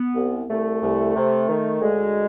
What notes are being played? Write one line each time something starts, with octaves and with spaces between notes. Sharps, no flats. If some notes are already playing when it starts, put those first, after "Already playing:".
Already playing: B3
C2
C2 A3
C2
C3
D#3
D2 G#3